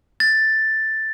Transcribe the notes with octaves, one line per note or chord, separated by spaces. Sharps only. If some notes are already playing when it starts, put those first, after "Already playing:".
A6